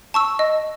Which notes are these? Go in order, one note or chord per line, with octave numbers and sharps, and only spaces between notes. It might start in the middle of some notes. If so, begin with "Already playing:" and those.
A5 C#6 E6
D#5